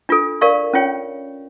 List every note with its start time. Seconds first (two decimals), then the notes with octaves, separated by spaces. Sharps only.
0.09 D4 F4 A4
0.41 A#4 D5 F5 C#6
0.74 C#4 F4 C#5 G5